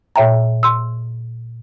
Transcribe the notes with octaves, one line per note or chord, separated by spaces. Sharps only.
A#2 C#5 E5 G5 A#5
C6 E6